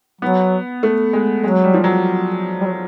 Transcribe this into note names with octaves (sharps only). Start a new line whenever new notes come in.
F#3 B3
A3
G#3
F#3 G#3
G3
F3
F#3
G3
F#3